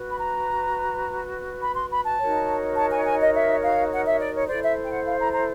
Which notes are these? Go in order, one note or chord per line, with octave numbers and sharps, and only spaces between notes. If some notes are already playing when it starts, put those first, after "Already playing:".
Already playing: F#4 B4
B5
A#5
B5
C6
B5
A5
D#4 F#4 A#4 C#5
A5
G#5
G#5
D#5
E5
F5
F#5
E5
D5
C#5
E4 A4 C5 D5
E5
G5
F#5
F5
A#5
A#5